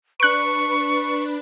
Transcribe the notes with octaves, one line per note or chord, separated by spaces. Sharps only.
D4 B4 C#6 F#6 D7